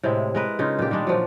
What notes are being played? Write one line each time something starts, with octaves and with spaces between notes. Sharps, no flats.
A2 C3 G#3 E4
G#3 A#4 B4
C#3 C#4 D#4 F4
A#2 A#3 D4 G4
D#3 G3 G#3 D4
A#2 F3 F#3